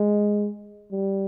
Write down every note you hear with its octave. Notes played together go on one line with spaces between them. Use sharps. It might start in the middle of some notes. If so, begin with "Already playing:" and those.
Already playing: G#3
G3